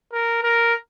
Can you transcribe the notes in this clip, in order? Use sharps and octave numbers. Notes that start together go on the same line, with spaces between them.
A#4
A#4